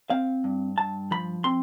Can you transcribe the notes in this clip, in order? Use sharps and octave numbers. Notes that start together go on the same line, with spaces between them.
C4 F5
G2
G2 A5
F3 B5
C4 C6